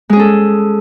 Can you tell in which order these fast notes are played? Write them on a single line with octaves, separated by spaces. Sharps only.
G#3 G#4 C#4 A4